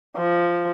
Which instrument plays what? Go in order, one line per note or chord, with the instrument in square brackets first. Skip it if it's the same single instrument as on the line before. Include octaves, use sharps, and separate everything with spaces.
[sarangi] F3